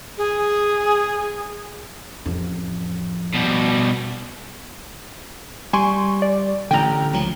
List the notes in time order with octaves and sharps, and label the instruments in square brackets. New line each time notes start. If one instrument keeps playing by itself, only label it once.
[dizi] G#4
[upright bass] A1 F2
[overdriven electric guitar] B2 G3
[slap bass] G3 [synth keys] G#5 C6 C#6
[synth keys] D5
[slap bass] A1 D3 [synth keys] G5 A#5
[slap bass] C#2 F3 F#3